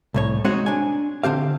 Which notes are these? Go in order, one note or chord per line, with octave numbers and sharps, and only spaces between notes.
C2 A2 C#5
G#3 C4 D#4 F#4 C#5 F#5
D4 G#5
D3 C4 G4 F5